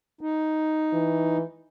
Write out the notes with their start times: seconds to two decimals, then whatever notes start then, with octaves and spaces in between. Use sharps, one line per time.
0.21 D#4
0.93 E3